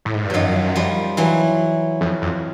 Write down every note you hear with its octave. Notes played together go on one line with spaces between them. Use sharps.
A2
G#2
G2
F#2 D#3 F3 F#3
F3 G3
E3 F#3
F2
F2